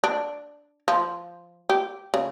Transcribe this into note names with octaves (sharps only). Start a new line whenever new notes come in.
D4
F3
G4
C#3